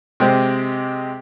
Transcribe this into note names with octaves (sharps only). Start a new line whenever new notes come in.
C3 G#3 G4 C5